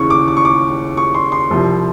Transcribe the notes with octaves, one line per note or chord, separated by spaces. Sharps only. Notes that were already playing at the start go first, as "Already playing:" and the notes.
Already playing: D#2 C#3 E3 C#6
D6
D6
C#6
D6
C#6
C6
C6
C2 C3 F3